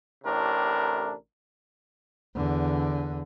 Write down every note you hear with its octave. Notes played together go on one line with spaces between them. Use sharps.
A1 A2 C3 D4 A#4
E2 D3